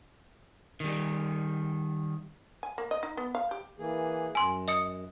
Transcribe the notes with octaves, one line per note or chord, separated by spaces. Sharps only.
D#3 G3
G#5
A#3
D#5
D#4
B3
F5
G4
E3 A#3 G#4
F#2 G#5 C6
D#5 D#6 C#7